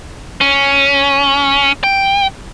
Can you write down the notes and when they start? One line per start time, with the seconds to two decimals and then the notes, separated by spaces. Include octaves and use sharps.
0.41 C#4
1.84 G5